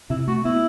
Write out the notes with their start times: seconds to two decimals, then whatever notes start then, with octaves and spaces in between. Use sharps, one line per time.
0.10 C3 E4
0.28 A3 F#4
0.45 B3 E4